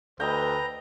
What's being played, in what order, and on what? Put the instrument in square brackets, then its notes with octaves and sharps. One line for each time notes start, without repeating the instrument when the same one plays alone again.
[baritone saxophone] D2 [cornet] B4 [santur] D#5 G5 [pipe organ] A#5